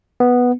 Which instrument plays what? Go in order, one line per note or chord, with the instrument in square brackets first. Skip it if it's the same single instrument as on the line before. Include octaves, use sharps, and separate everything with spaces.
[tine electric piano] B3